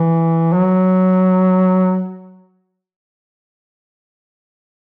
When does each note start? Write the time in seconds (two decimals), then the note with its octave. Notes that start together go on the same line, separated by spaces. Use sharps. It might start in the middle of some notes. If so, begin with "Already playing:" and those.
Already playing: E3
0.53 F#3